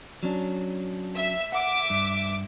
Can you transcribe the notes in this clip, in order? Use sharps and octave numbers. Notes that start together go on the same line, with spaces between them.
F#3 C#4 D4
E5
E5 F#5 D6
G2